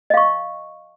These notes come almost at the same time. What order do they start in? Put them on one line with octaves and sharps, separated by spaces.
D#5 F5 C#6